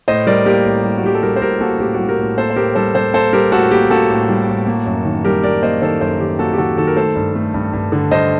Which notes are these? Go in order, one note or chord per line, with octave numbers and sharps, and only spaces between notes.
A2 C5 D#5
G3 A#4 D5
A#3 G4 A#4
A2
G3
F#4
G3 G4
A4
G3 G4 A#4
C5
A2 G4 A#4
A#3 F#4 A4
A2 G4
G3 F#4
G4 A#4
A2
A#3 A4 C5
C5
A2 G4 A#4
G3 A4 C5
G3 A4 C5
A#3 A4 C5
G3 G4 A#4
A2 F#4 A4
A#3 G4
A#3 F#4 A4
A2
G3
A2
A#3
F#2
D#3
G3 G4 A#4
G3 A#4 D5
A#3 C5 D#5
D#3 A4 C5
F#2 A4 C5
D#3 G4
A#3 F#4 A4
G4
D#3 F#4 A4
D#3 F#4 A4
A#4
A3 A4 C5
G2
A3
G2
G2
D3
G2 C5 D#5